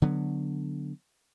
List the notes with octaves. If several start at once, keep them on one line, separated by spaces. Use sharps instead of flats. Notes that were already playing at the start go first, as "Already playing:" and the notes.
D3 F#3 B3